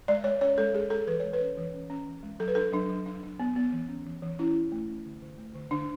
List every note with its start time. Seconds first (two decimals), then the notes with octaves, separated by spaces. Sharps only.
0.08 G#3 D5
0.24 G#3 C#5
0.41 C#4 C#5
0.58 G#3 A4
0.74 G#3 G#4
0.90 G#3 A4
1.07 E3 B4
1.20 G#3 C#5
1.33 B4
1.41 C#4
1.57 E3
1.74 C#4
1.90 C#4
2.06 E3
2.23 G#3
2.40 F#3 A4
2.48 B4
2.55 D4 A4
2.73 F#3 D4
2.89 F#3
3.06 D4
3.23 D4
3.40 B3
3.56 B3
3.72 E3
3.88 C#4
4.06 E3
4.22 E3
4.39 C#4 E4
4.55 C#4
4.72 A3
4.88 C#4
5.05 D3
5.22 D3
5.38 A3
5.55 D3
5.71 D3 D4